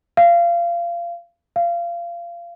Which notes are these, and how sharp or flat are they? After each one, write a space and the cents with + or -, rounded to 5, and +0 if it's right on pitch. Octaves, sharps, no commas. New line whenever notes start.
F5 -25
F5 -25